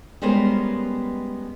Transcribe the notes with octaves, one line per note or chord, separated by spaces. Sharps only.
G3 G#3 B3 C#4 A#4 C5